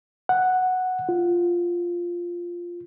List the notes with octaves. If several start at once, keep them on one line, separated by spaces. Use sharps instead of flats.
F#5
F4